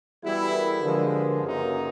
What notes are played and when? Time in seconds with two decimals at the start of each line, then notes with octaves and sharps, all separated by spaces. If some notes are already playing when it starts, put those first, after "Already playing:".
0.23 E3 G3 B3 E4 F#4 G#4
0.37 G4 A4
0.46 B4
0.52 G#4 A#4
0.68 A4 B4
0.82 D3 F3 G#3 G#4 A#4
1.42 F#2 C#3 F#3 A#3 D#4